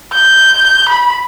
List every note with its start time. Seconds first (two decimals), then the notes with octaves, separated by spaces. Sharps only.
0.13 G6
0.89 B5